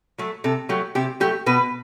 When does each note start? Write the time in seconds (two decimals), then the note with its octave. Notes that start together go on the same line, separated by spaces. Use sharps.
0.18 F#3 A3
0.44 C3 A4
0.69 F#3 A3 G4
0.95 C3 G4
1.20 F#3 A3 G4
1.46 B2 B4